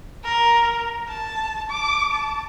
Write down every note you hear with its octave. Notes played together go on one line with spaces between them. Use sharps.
A#4
A5
D6
A5